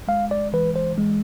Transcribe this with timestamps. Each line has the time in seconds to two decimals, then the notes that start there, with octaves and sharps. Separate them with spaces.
0.08 G#3 F5
0.31 D5
0.53 E3 B4
0.76 C5
0.98 G#3